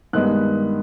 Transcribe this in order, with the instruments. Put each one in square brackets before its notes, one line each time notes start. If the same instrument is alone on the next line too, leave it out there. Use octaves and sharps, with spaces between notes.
[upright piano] G2 D#3 G#3 B3 F#6